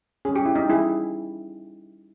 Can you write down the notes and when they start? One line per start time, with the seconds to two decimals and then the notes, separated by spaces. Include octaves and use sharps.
0.25 G3 C#4 G#4
0.35 G4
0.45 E4
0.55 D#4 G4
0.70 G3 C#4 E4 G#4